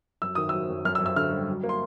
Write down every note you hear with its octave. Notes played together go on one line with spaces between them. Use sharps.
F#2 E6
D#3 D#6
F#3 E6
F#2
F#2 F6
E6
F#2
E6
D3 F6
G3
F#3
A#3
C6